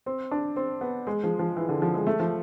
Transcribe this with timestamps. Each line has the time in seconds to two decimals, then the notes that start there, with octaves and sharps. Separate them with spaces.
0.06 C4
0.31 D4
0.56 C4
0.81 B3
1.07 G#3
1.24 F3
1.39 F3
1.57 E3
1.69 D3
1.82 F3
1.94 G#3
2.07 A3
2.20 F3